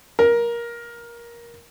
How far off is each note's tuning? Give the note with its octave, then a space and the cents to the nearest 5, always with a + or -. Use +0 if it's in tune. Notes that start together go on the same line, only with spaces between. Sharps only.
A#4 +15